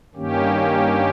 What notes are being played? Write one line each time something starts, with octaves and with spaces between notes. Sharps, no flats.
G2 D#3 A#3 C#4 G4